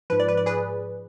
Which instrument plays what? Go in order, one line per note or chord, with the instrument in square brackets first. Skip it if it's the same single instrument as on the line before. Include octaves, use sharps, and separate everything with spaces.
[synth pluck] G#2 F3 B4
D5
B4
D5
G#4 B4